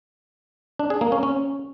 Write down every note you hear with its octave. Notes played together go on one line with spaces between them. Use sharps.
D4
G#4
A#3
C#4
C#4